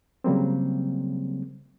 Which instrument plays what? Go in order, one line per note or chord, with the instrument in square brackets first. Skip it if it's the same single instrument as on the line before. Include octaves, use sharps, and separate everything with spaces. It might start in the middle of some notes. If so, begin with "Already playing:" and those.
[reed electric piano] C#3 F#3 G3 A#3 C4